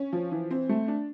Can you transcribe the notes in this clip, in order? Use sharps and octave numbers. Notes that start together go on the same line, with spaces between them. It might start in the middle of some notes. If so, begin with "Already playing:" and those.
Already playing: C#4
F3
E3
C4
A3
D4